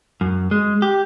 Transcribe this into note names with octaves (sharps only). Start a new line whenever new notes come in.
F#2
G#3
G4